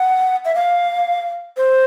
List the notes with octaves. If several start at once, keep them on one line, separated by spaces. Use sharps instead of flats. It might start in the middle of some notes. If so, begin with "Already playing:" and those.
Already playing: F#5
E5
F5
C5